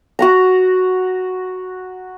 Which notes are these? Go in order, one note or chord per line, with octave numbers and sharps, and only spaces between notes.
F#4 F#5 A#5